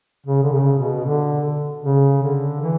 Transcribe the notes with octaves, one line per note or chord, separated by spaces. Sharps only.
C#3
D3
C#3
B2
D3
C#3
D3
E3